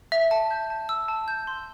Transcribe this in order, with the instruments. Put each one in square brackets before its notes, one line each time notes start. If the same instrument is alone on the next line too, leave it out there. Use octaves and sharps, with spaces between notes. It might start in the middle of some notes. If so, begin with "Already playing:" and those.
[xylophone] E5
A5
G6
A5
E6
A5
G6
C6